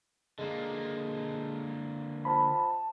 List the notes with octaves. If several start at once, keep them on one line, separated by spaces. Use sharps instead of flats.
D3 G#3 A#3
F3 A5 B5